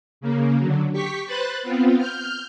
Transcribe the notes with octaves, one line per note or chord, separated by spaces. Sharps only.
C#3 A#3
D3 F#3
G4 C#6 B6
B4 C5 B5 F#6 A6
B3 C4 F4
F6 G6